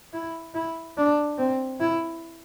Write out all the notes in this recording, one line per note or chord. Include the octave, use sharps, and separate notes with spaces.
E4
E4
D4
C4
E4